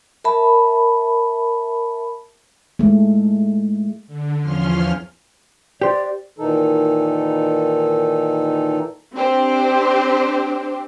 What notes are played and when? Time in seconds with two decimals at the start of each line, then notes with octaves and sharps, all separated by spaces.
0.24 A#4 E5 A5 B5
2.79 G#3 A3
4.07 D3
4.42 E2 F3 C#4 C6 F6
5.82 G4 C5 D5
6.39 A#2 D#3 E3 D#4 A4
9.14 C4 D4 G4 C5